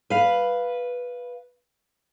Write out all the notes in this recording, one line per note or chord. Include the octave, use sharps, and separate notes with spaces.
B4 F5